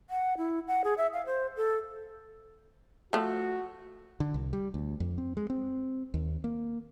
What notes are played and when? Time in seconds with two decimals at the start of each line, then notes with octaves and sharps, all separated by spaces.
0.10 F#5
0.38 E4
0.68 F#5
0.84 G#4
0.98 E5
1.13 F5
1.26 C5
1.57 A4
3.13 F3 A3 F#4
4.20 D3
4.34 C2
4.53 G3
4.74 D2
5.00 F2
5.18 C4
5.37 G#3
5.50 C4
6.14 D#2
6.44 A#3